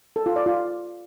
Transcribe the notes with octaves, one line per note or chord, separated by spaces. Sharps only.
A4
F4
D5
F4